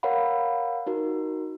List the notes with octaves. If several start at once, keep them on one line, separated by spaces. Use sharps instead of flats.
A#4 C#5 F5 F#5 B5
D#4 F#4 A#4